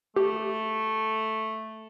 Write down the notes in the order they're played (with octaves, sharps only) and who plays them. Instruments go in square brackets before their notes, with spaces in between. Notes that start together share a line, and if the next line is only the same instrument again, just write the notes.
[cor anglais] A3 [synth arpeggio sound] G4